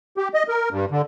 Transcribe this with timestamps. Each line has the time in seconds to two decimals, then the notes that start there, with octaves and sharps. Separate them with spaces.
0.17 G4
0.34 D#5
0.48 A#4
0.71 G2
0.91 D3